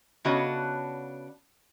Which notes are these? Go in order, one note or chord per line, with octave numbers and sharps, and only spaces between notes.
C#3 B3 D4 F#4 C#5 D#5